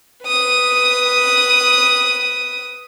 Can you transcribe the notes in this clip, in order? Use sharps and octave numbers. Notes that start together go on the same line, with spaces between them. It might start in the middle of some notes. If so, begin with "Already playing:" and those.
B4 D#6